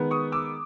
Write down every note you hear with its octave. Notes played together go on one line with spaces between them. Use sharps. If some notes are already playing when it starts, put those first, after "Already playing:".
Already playing: D#3 G#3 B3
C#6 D#6
D6 E6